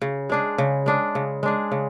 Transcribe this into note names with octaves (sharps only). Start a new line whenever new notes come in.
C#3
G#3 D4 G#4
C#3
G#3 D4 G#4
C#3
G#3 D4 G#4
C#3